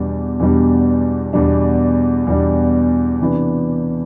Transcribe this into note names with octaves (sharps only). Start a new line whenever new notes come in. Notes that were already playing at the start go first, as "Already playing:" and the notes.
Already playing: E2 B2 G3 D4
E2 B2 G3 D4
E2 B2 G3 D4
E2 B2 G3 D4
C3 E3 B3 D4